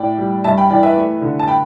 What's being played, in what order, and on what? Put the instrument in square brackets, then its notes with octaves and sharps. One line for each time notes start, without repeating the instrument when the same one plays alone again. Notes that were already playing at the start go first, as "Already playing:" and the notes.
Already playing: [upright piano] A2 A3 D5 G5
G3
G2 E5 A5
G5 B5
E3 D5 G5
B4 E5
A3
D3
A5
G5 B5